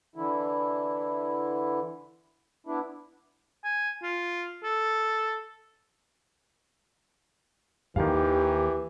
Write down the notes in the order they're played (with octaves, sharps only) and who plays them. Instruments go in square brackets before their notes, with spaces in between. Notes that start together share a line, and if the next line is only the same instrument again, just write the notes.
[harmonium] D3 E3 E4
B3 D4 E4
[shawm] G#5
F4
A4
[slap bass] D#2 [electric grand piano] D#3 F5 [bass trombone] E3 [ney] G4